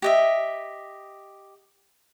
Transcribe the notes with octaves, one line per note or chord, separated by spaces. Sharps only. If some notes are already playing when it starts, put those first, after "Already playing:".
G4 D#5 E5